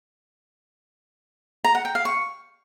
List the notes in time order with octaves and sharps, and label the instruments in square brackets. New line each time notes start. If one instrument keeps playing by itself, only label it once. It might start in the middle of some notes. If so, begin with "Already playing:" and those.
[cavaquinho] A#5
F#5
G5
F5
C#6